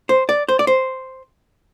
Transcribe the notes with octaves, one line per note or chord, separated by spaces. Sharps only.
C5
D5
C5
D5
C5